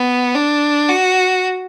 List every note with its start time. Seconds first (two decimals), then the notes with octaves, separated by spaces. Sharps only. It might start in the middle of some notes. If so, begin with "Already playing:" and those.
Already playing: B3
0.35 D4
0.89 F#4